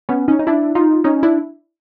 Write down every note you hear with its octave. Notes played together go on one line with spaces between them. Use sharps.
B3 C#4
C#4 D#4
D#4
D4 E4
D#4 F4
C#4 D#4
D4 E4